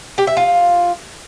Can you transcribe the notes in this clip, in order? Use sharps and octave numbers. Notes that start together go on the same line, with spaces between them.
G4
E5
F4